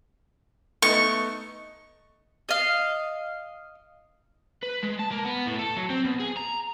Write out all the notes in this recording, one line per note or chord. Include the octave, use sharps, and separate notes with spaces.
A3 B3 D#4 C#6
D#5 F5
B4
G#3
A5
A#3
B3
A2
A4
F#3
C4
B2
G#4
A#5